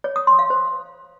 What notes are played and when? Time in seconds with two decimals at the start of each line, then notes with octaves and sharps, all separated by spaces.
0.04 C#5
0.16 D#6
0.27 C6
0.39 F5
0.50 C5